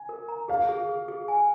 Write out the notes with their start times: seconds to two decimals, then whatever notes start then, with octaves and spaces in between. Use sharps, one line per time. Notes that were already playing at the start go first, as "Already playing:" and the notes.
Already playing: G#5
0.09 A#4
0.28 A#5
0.48 G#4 F5
0.69 G#4
0.89 G#4
1.08 G#4
1.28 G#5